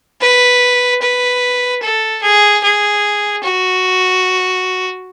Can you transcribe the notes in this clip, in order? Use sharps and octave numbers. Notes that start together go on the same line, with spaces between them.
B4
B4
A4
G#4
G#4
F#4